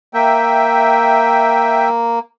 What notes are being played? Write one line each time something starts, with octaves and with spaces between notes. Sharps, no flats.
A#3 E5 G5